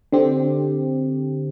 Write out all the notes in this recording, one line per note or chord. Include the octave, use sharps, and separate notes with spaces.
D3 C4 G4